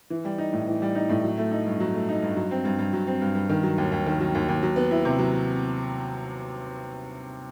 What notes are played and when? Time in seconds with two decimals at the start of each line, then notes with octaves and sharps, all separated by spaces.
0.10 E3
0.25 G3
0.38 D#4
0.53 A2
0.67 E3
0.82 G3
0.95 D#4
1.09 A2
1.24 F#3
1.38 A3
1.51 D#4
1.66 G2
1.80 F#3
1.95 A3
2.09 D#4
2.23 G2
2.36 F#3
2.51 C4
2.65 G2
2.79 G2
2.93 F#3
3.07 C4
3.22 G2
3.35 G2
3.49 D#3
3.63 F#3
3.78 D#2
3.92 D#2
4.06 D#3
4.20 F#3
4.35 D#2
4.48 D#2
4.63 F#3
4.76 B3
4.91 E4
5.05 C3
5.19 F#3